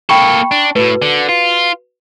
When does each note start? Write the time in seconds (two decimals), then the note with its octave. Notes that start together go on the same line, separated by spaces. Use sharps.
0.09 A#3 A4 G5 B5 C#6
0.51 D4
0.76 A2 F#4 B4
1.02 D3
1.29 F4